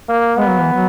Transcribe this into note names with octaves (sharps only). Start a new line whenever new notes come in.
A#3
G#3 B3
F#3
E3
F#3